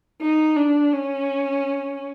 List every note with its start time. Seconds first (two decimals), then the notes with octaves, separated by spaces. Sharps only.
0.22 D#4
0.57 D4
0.93 C#4